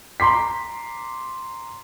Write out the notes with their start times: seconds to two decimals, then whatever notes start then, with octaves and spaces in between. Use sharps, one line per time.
0.20 A#5 C6 D6 B6